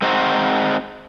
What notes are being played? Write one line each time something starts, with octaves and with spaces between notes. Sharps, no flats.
G#3 C4 D#4 F#4 C5